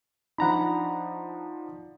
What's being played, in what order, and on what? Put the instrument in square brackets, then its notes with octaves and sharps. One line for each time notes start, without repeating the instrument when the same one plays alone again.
[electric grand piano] F3 D4 D#4 [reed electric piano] F#5 A#5 B5